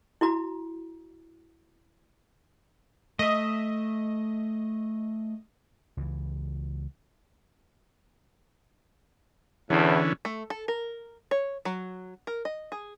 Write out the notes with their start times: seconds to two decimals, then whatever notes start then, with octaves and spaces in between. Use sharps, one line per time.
0.21 E4 F#4 A#5
3.19 A3 D#5 E5
5.97 C#2 E3
9.70 E2 A2 D3 E3 C#4
10.25 A3
10.50 A4
10.68 A#4
11.31 C#5
11.65 F#3
12.27 A#4
12.45 D#5
12.72 G#4